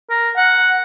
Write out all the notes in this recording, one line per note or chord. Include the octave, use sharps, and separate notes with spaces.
A#4
F#5